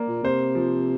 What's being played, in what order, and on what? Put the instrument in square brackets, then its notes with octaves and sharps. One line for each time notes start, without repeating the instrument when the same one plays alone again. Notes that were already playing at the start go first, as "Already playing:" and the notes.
Already playing: [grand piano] A#3 D5
[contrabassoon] A#2
[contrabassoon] C3 [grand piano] C5
[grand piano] F3